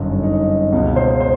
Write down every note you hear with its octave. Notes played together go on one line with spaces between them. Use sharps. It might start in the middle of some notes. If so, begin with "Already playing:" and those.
Already playing: G1 F#2 D3 D#4
D#4
C#2 B2
C5
C5